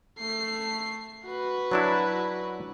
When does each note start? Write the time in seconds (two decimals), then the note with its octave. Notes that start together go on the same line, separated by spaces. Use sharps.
0.19 A3 C7
1.27 F#4 B4
1.71 F#3 D4 E4